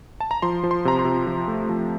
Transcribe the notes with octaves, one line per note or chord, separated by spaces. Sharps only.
A5
A#5
F3 C6
F3
C6
C3 A#5
C6
C3
F3
A3
F3